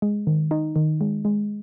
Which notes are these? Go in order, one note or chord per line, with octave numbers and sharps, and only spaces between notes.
G#3
D#3
D#4
D#3
G#3
G#3